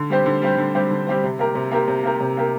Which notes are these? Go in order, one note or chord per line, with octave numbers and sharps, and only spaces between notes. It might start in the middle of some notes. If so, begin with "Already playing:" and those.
Already playing: D3
G3 C4 G4 C5
D3
G3 C4 G4 C5
D3
G3 C4 G4 C5
D3
G3 C4 G4 C5
C3
A#3 G4 A#4
C3
A#3 G4 A#4
C3
A#3 G4 A#4
C3
A#3 G4 A#4